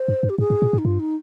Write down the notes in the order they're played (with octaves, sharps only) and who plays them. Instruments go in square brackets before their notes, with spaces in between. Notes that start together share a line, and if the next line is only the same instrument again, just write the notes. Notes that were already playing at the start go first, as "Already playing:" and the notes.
Already playing: [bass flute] C5
[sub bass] G2
G2
[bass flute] G4
[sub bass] G#2 [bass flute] G#4
[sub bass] G#2
A#2
G#2
[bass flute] D#4
[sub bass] G2 [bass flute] F4
[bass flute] D#4